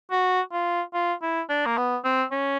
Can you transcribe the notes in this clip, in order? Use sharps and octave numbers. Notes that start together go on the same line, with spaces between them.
F#4
F4
F4
E4
D4
A#3
B3
C4
C#4